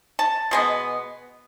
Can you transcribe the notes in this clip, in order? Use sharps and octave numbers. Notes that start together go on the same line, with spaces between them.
A5
B2 G#3 B3